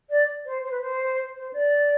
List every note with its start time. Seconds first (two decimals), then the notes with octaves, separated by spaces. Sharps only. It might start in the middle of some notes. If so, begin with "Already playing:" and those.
0.10 D5
0.46 C5
0.64 C5
0.71 B4
0.81 C5
1.36 C5
1.53 D5